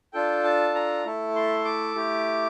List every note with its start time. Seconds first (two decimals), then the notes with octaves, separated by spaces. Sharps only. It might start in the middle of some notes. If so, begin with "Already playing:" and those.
0.13 D4 F4 A4 G5
0.44 A5
0.75 A#5
1.05 A3 E4 A4
1.36 C6
1.65 D6
1.95 A3 E4 G4